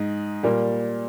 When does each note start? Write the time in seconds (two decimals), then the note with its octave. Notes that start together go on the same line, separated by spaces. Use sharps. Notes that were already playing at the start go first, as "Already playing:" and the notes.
Already playing: G#2 D#4
0.43 A#2 G3 A#3